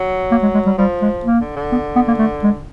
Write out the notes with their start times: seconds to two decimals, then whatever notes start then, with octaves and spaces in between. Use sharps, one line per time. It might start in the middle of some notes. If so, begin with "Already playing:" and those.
Already playing: F#3
0.31 A#3
0.43 G#3
0.54 G#3
0.66 G3
0.78 F3 G3
1.02 G#3
1.25 A#3
1.41 D3
1.56 D3
1.72 B3
1.96 B3
2.08 A#3
2.19 A3
2.43 G#3